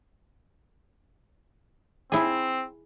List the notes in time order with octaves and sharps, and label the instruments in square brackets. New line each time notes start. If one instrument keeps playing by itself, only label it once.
[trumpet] C4 [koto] E4 G#4